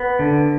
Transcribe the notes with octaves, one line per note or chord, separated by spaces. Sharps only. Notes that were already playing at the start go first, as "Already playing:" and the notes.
Already playing: B3
D3